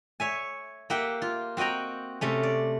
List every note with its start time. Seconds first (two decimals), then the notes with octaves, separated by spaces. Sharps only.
0.20 C#5 E5 G#5
0.90 A#3 G4 E5 F#5 G5
1.22 F4
1.57 C4 F#4 D#5 G5 A#5
2.21 C3 A3 C#4
2.43 D5